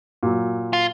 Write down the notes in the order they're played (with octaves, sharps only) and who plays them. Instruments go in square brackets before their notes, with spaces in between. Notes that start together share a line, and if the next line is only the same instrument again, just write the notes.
[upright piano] A#2 F#3
[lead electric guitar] F4